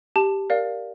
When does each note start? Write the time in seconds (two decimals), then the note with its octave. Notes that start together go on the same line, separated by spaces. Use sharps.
0.16 G4 A5
0.50 A#4 D5 F5